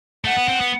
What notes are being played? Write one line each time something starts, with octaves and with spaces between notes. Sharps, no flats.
A3 F#5
B3
C4
B3